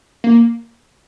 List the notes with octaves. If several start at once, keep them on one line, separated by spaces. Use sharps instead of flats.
A#3